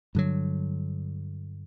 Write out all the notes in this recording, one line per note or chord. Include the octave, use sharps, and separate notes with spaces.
G2 D3 F#3